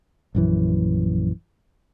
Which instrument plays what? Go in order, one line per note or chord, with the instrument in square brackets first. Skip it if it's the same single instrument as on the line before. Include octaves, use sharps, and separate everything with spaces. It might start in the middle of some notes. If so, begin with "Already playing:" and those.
[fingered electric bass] A#1 F#2 E3